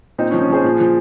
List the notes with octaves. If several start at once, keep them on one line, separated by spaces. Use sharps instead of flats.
A#2 C4 D#4
C#4
F3
C#4
F3 G#4 C5
A#2
F3